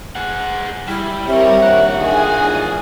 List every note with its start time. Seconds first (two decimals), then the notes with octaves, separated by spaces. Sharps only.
0.15 G#4 F#5
0.88 G3 E4
1.27 C4 G4 A#4 C#5 E5
1.63 A#1 D#2 F4 F#5
2.00 D3 D#3 G#4 G#5
2.39 A#1 E2 G#2